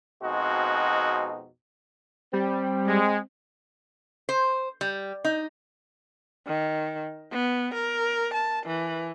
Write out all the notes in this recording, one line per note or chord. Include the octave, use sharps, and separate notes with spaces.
F2 B2 G#3 C4 D#4 F#4
G3 C4
G#3
C5
G3
D#4
D#3
B3
A#4
A5
E3